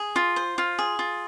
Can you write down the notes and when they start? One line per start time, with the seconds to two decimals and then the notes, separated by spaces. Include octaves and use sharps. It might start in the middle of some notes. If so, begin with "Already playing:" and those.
Already playing: G#4
0.16 F4
0.36 C5
0.58 F4
0.79 G#4
0.99 F4